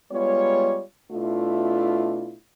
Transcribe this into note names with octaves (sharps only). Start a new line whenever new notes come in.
G3 G#3 B3 F4 C#5
B2 A3 D4 E4 F4